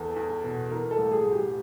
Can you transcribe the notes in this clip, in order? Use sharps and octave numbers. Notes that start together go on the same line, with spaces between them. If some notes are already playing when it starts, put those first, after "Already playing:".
Already playing: E2 B3 A4
E2
B2
E3 A#4
A4
A1
G#4
A1
G4